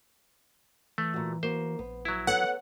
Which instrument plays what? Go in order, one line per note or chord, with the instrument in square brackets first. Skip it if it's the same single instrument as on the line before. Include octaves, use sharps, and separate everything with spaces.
[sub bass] E3 [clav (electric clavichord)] A3
[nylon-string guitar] A#2 F#4
[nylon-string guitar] A#3 F#4 [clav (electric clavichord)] C5
[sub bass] A#1 [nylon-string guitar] B3
[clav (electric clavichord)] F#3 E4
[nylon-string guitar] B3 A4 C#5 [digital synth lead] F#5